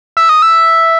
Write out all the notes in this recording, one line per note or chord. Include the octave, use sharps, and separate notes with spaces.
E5
D#5
E5